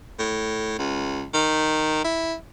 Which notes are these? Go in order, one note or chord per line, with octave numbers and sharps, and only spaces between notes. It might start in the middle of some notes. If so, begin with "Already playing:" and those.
A2
C#2
D#3
E4